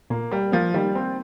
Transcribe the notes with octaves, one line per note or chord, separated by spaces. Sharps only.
A#2 A#3
G3 A#3
F3 A#3
D#3 G3
A#3 C4